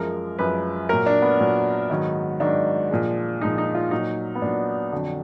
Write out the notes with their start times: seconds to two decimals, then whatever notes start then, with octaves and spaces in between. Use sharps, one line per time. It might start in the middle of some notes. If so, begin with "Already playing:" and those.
Already playing: F#2 F3 G#3 A#4
0.39 F#2 F3 G#3 B4
0.89 A#2 F#3 A#4
1.06 D4
1.22 B3
1.40 A#2 F#3
1.90 G#2 D#3 F#3
2.40 G#2 D#3 F#3 D4
2.90 A#2 F3 G#3
3.41 A#2 F3 G#3 D#4
3.58 D#4
3.75 F4
3.91 A#2 F#3 D#4
4.35 B3
4.42 A#2 F#3 D4
4.92 F2 D3 F#3